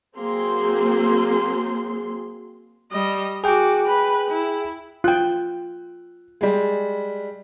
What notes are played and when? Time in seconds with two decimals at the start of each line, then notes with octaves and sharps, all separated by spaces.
0.18 F#3 A#3 C4 G#4 C6
2.92 G3 D#5
3.44 F#4 G#4 G5 D6
3.86 B4 B5
4.29 E4
5.04 F4 G5 F#6
6.41 G3 G#3